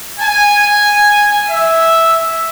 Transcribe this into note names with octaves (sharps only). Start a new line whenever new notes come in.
G#5
E5